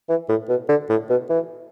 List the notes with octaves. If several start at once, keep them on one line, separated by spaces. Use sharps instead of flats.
E3
A2
B2
D3
A2
B2
E3